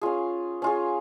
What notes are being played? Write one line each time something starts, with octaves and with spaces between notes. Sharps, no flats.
C#4 F4 G#4
C#4 F4 G#4